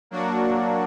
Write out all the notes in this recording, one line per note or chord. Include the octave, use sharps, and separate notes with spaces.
F#3 A#3 D4 F#4